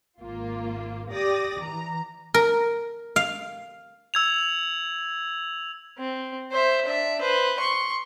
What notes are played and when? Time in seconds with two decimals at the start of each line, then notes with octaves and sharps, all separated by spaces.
0.21 G#1 A#3 F4
1.11 G4 D5 D#6 A#6
1.61 E3 A#5
2.34 A#4
3.16 F5
4.14 E6 G#6 F7
5.98 C4
6.51 C5 E5
6.86 D4 E5
7.21 B4 C5
7.59 C6 C#6